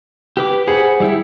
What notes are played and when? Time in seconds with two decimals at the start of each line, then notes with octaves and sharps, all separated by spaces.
0.37 G4 B4 D6
0.67 G#4 C5 F#5 B5
1.00 G3 E4 G4